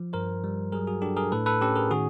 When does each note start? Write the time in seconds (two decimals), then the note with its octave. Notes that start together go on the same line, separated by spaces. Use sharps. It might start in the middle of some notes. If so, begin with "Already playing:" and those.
Already playing: F3
0.13 G2 A#4 C5
0.44 G3
0.72 F#3 G#4 A#4
0.87 F#4 G#4
1.02 D4 G4 A4
1.17 G#4 A#4
1.32 A2 A4 B4
1.46 A4 B4
1.61 C#4 G4 A4
1.76 G#4 A#4
1.91 D#3 F#4 G#4